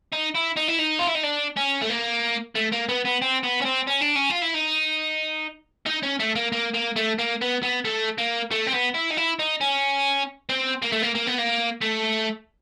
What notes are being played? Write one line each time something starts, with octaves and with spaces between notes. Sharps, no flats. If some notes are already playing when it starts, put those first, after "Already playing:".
D#4
E4
D#4
E4
D#4
F4
E4
D#4
D4
C#4
A3
A#3
A3
A#3
B3
B3
C4
B3
C#4
C4
C#4
D4
C#4
F4
E4
D#4
D#4
C#4
A3
A#3
A#3
A#3
A3
A#3
B3
B3
A3
A#3
A3
C4
B3
E4
D#4
E4
D#4
C#4
C4
A#3
A3
A#3
A#3
B3
A#3
A3